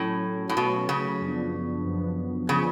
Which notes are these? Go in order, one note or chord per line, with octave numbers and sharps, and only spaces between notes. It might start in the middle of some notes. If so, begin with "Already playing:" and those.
Already playing: A2 F#3 A3 C#4
A2
B2 F#3 A3 C#4
C#3
F#2 F3 B3 D4
F#2 F3 B3 D4
C#3 F3 B3 D4 G#4